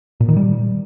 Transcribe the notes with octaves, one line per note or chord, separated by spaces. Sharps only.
A#2
D#3
G3